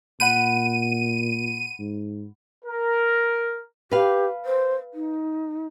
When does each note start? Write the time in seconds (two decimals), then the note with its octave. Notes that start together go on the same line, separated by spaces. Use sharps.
0.20 A#2 F#5 B5 G6 D#7
1.79 G#2
2.65 A#4
3.91 G4 B4 F5
4.45 C5
4.94 D#4